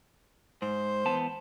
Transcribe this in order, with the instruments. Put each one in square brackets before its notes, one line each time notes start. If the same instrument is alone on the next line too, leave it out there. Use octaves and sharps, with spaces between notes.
[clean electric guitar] G#2 [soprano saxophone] C5
[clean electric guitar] E2 B3 A5